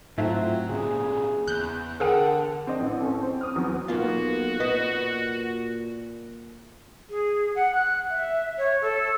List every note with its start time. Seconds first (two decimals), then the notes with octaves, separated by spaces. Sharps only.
0.18 G#2 F#3 A3 C4 E4 F4
0.69 A#2 C#3 G#4
1.47 E2 F#6 G6
2.00 D3 G#4 A#4 F#5 G5
2.67 C4 D4 D#5
2.80 A1
3.00 C#4 A4
3.21 C4 C5
3.41 D6 D#6 F6
3.56 E2 F#3
3.88 B1 A#3 B3 F4 F#4
4.60 A#2 B4 D#5
7.10 G#4
7.56 F#5
7.75 F#6
8.11 E5
8.58 C#5
8.81 A4